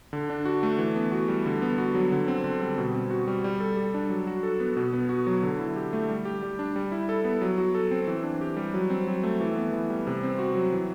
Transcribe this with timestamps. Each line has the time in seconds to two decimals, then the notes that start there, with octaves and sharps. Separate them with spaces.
0.13 D3
0.30 D4
0.45 F#4
0.63 A3
0.79 E3
0.96 B3
1.12 F#4
1.28 G3
1.46 D3
1.62 B3
1.78 F#4
1.95 F#3
2.12 D3
2.28 C4
2.44 D3
2.62 G3
2.78 B2
2.94 C4
3.10 F#4
3.28 G3
3.44 G3
3.60 A4
3.77 G3
3.94 D4
4.10 F#3
4.27 F#4
4.43 A4
4.60 B3
4.77 B2
4.93 B3
5.09 F#4
5.27 F#3
5.43 D3
5.59 E4
5.76 G4
5.93 A3
6.09 G3
6.25 G4
6.43 G3
6.59 D4
6.76 G3
6.92 E4
7.09 A4
7.24 B3
7.42 F#3
7.58 F#4
7.75 A4
7.91 C4
8.07 E3
8.24 D4
8.41 G4
8.57 G3
8.74 F#3
8.90 C4
9.07 F#3
9.23 A3
9.41 E3
9.56 B3
9.72 E3
9.90 G3
10.07 C3
10.23 C4
10.39 F#4
10.55 F#3
10.73 E3